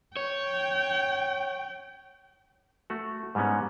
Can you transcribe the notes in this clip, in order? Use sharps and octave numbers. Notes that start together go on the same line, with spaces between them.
C#5 G5
A3 F#4
G#2 G3 G#3 B3 C#4